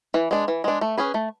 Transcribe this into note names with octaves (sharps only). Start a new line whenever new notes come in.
E3
G#3 D4
E3
G#3 D4
A3
C#4 G#4 B4
A3